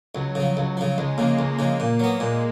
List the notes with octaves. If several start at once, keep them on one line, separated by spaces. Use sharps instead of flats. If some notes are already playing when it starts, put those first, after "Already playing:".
C#2 F#3
C#3 F3
C#2
C#3 F3
C#2 G#3
C#3 F3 A#3
C#2
C#3 F3
A#2
F#3 B3
A#2 G#3